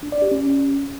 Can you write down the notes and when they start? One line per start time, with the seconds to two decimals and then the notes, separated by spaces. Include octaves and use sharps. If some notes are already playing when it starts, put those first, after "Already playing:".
0.03 D4
0.12 D5
0.22 G4
0.32 C#4